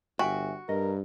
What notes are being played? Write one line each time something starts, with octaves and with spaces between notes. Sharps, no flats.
G1 F#4 E5 G5 G#5
G2 A#4 D#5